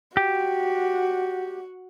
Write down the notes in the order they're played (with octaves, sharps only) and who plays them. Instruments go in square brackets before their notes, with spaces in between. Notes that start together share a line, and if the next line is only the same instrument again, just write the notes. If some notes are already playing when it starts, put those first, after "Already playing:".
[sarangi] F#4 [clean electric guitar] G4